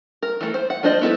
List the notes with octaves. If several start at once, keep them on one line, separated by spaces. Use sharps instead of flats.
A#4
E3 A3
C5
F#5
F3 D4 C5 D#5
B3 E4 A4 B4